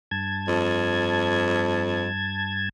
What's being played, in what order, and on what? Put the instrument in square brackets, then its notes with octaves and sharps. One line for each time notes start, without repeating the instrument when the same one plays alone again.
[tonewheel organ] G2 A5 G#6
[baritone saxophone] F2